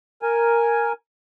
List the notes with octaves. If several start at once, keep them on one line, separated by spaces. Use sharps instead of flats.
A#4 G#5